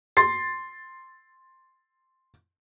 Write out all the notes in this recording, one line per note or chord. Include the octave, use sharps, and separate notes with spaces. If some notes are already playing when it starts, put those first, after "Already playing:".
C6 A6 C7